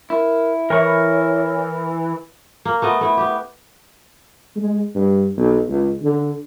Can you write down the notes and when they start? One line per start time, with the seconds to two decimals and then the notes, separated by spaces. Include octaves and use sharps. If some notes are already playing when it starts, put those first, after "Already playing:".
0.10 E4 A#4
0.70 E3 A#4 C#5 C#6
2.65 A#3
2.82 A3 B3 D#5
3.01 A3 E4
3.17 B3 G4
4.56 G#3
4.95 G2
5.37 B1
5.69 C#2
6.03 D3